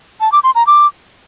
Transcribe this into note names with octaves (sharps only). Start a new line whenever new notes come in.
A5
D6
C6
A#5
D6